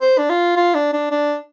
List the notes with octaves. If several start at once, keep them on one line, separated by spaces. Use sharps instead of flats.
C5
D4
F4
F4
D4
D4
D4